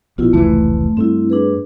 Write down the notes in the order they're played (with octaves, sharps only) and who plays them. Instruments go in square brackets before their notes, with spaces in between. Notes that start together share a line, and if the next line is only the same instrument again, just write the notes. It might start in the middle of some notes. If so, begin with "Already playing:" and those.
[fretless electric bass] A#1 B2 [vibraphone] E4 F4
[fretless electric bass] F1 C#2 E3 [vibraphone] A3
[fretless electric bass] G2 A3 [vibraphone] C4 E4
[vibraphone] D4 G#4 B4